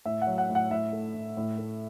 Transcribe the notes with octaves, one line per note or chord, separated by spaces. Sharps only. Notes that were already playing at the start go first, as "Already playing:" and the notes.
A2 E5
F#5
F#3
F#5
A2
F#5
A2 E5
A3
A2
A2
A3